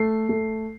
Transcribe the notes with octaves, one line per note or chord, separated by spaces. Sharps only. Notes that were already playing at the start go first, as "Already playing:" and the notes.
Already playing: A3 C7
A3